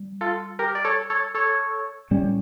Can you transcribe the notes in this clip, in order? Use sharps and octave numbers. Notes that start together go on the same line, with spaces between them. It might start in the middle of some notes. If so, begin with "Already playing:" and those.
Already playing: G3
F4 A4
G4 A#4
D5
A4 C#5
A4 C#5
A4 C#5
A2 G3 C#4